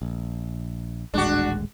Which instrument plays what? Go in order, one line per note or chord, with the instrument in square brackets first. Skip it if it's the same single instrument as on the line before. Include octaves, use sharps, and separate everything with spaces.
[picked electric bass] A#1
[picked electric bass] D#1 A1 G#3 [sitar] D4 F#4